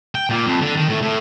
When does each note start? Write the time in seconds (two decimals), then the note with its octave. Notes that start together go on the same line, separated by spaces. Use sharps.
0.15 G5
0.30 A#2
0.47 F2
0.61 D3
0.76 D#3
0.88 A2
1.02 A2